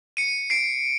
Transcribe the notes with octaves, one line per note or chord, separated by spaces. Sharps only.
C#7 D#7
C7 D7